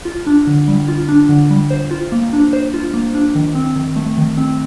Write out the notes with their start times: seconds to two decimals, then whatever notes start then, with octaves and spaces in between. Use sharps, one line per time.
0.05 F4
0.27 D4
0.47 D3
0.68 G3
0.88 F4
1.09 D4
1.29 D3
1.50 G3
1.70 C5
1.91 F4
2.12 A#3
2.33 D4
2.53 C5
2.74 F4
2.94 A#3
3.15 D4
3.35 D#3
3.55 C4
3.76 D#3
3.96 A3
4.18 D#3
4.37 C4